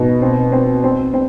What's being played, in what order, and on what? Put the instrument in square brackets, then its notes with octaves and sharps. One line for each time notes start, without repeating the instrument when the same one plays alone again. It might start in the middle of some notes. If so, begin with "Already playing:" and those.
Already playing: [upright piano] B2 D#4
C4
C4
C4
C4